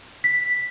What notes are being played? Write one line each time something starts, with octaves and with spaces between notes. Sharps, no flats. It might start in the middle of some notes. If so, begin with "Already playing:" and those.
B6